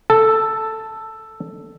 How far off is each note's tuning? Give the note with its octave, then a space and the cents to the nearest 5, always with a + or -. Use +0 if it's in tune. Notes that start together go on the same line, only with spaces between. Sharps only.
A4 +5